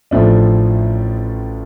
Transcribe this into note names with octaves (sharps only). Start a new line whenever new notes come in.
A1 A2 F3 A3 D4